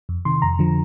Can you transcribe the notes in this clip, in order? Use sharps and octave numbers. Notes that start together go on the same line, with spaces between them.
F2
C3 D#3 C6
F2 A#5
D3 F3